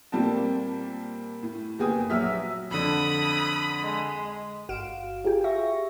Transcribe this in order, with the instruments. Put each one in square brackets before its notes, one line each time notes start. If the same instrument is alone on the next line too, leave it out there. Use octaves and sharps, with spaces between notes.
[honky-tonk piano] A#2 G3 A#3 C4 A5
A2
F#1 B3 G4 G#4 D#6
A#1 F#3 E5 E6 F6 B6
[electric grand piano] F2 D3 [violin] B5 D#6
[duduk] G#3
[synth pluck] G1 F#4 F5 D7 E7
F4 G4 G#4 G5
E5 C#6 A#6